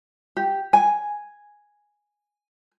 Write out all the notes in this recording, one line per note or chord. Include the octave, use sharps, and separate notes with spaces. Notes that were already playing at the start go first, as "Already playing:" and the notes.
G4
G#5